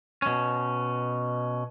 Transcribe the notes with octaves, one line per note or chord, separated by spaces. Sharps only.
B2 C#4